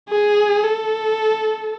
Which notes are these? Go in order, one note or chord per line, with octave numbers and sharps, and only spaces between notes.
G#4
A4